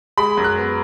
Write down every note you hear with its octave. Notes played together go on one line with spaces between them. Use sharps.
G#3 B5
F#2
F#6
B3